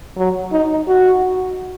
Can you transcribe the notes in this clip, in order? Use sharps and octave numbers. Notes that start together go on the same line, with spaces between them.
F#3
D#4
F#4